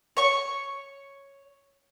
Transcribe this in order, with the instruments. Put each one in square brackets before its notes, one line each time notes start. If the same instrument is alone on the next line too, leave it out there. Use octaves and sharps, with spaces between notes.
[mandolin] C#5 C#6